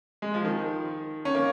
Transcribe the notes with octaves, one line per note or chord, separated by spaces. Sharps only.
G#3
F3
D#3
C#4
A#3